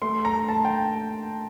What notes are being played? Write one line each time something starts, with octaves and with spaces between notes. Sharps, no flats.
A3 C6
A#5
A3 A5
G5